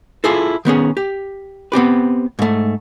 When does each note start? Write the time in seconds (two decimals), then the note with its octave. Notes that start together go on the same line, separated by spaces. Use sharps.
0.24 E4 F4 G#4 A4
0.65 D#3 B3 C#4 G#4
0.97 G4
1.72 B3 C4 G4 B4
2.39 G#2 A3